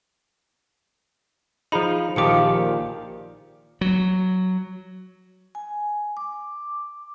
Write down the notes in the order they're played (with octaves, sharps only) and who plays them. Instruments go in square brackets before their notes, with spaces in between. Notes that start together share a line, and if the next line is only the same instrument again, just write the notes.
[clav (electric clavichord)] F3 D#4 [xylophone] G#4 B5
[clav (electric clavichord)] A#1 D#3 G4 [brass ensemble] F3 [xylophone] D6 C#7
[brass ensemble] A#2
[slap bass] F#3
[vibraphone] G#5
D6